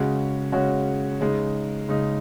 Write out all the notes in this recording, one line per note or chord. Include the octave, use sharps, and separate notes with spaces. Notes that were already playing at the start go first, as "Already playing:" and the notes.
Already playing: C#3 G#3 C#4 F#4 C#5
C#3 G#3 C#4 F#4 C#5
C#3 G#3 D#4
C#3 G#3 D#4